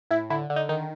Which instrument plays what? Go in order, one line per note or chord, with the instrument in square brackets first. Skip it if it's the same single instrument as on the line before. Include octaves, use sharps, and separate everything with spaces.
[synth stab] A2 E4
D3 E4
D3
D#4
D#3 D#4